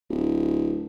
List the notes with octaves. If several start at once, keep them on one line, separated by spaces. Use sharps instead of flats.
D1